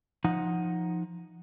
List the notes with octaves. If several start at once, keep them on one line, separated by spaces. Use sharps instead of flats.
F3 D#4 F#5